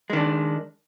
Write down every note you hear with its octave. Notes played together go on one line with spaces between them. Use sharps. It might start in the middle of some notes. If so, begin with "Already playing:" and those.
D#3 G#3 D4